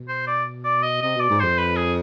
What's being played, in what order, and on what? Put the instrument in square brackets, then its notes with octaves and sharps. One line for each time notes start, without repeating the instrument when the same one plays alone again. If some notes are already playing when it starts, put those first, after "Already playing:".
Already playing: [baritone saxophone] B2
[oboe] C5
D5
D5
D#5
[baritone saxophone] C3 [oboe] D#5
[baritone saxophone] B2 [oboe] D5
[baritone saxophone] G#2
[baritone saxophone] F2 [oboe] C5
[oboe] B4
G#4